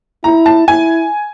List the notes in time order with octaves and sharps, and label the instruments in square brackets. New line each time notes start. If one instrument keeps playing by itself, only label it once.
[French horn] E4 [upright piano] A#5
[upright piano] A5
[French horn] E4 [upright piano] G#5